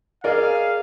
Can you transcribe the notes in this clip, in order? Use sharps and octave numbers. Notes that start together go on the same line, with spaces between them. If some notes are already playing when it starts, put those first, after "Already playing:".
G#4 A#4 D5 D#5 F5